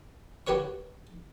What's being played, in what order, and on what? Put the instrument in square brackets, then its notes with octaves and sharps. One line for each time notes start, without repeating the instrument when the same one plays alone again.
[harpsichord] F#4 G4 B4 C#5 C#6